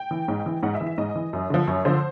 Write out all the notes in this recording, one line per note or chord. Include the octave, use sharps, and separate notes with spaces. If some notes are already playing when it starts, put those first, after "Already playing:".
Already playing: G5
E3
G#2
E3
G#2 F#5
E5
E3
E5
G#2 D#5
E3
F#2
D3 F3
F#2 C#5
D3 F3 C5